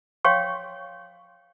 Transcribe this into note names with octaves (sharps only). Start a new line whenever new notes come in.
C#5 F5 G5 C6 C#6